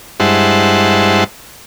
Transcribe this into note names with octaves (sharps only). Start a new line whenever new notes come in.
G2 G#3 E4 C5 F#5 A5